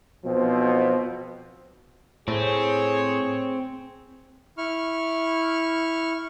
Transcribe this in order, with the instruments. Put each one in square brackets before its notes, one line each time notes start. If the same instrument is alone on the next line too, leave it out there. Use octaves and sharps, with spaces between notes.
[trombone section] B1 F3 C4 [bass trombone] B2
[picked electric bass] A2 [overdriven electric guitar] C4 [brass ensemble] G#4 C#5
[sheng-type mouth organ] E4 C#6 F6